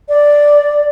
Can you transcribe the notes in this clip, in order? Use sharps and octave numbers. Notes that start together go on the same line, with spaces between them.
D5